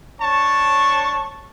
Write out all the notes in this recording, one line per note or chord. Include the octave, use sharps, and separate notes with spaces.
D4 C#5 A5 C#6